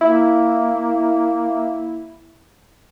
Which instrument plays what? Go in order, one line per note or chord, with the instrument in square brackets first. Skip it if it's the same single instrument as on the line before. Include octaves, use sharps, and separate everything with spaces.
[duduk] A#3 [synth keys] E4